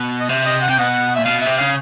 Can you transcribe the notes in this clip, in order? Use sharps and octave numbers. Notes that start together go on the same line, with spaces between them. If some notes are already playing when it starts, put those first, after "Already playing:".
Already playing: B2
D#5
C3 E5
D#5
F#5
C3 G5
B2 D#5 F#5
A#2 E5
B2 F5
C3 E5
C#3 F5